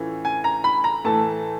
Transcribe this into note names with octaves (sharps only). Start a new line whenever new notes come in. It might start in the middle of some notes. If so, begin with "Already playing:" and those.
Already playing: A2 E3 A3 C#4 F4
G#5
A#5
B5
A#5
A2 E3 A3 A5